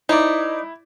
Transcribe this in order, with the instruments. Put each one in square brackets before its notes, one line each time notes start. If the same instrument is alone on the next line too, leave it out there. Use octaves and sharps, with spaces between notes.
[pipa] D#4 [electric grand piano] E4 [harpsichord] C5 D5